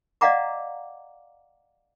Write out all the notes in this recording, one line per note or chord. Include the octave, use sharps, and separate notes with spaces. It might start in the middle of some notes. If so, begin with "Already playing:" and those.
D5 D#5 F5 F#5 A#5 D6